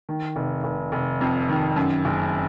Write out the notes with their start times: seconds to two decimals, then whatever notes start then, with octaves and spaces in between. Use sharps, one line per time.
0.09 D#3
0.36 F1
0.64 F1
0.92 F1
1.21 F2
1.49 D#3
1.76 F#2
2.05 F#1